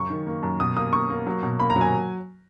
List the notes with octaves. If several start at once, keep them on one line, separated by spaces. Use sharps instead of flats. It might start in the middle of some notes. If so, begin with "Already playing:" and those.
Already playing: F#2 C#3 C#6
D#3
A#3
F#2
B2 D#6
A#3 D#6
A#3 C#6
A#3
F#3
B2
A#3 B5
A#5
F#3
G#5